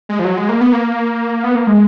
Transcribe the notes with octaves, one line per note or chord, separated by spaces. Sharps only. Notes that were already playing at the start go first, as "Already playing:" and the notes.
G#3
F3
F#3
G#3
A#3
B3
A#3
B3
A#3
G#3